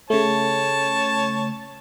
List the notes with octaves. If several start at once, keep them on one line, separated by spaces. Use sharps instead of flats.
C#3 A3 C#5 A5